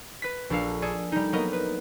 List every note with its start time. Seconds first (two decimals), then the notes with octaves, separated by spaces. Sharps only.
0.22 B4 B6
0.50 A#1 D4 A4 F5
0.82 G#4 A4 D5
1.12 G3 D#4
1.32 F#3 A#3 B3 A#4 D#5
1.53 B4